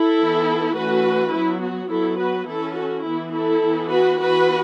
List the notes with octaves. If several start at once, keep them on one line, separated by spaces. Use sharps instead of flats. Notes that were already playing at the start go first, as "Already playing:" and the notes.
Already playing: E4 A4
E3 B3
E3 A3 C#4 F#4 B4
F#3 B3 E4
F#4
F#3 B3 E4 A4
F#4 B4
E3 C#4 E4 A4
F#4
E3 B3 E4
E4 A4
E3 B3
F#4 B4
E3 B3 F#4 B4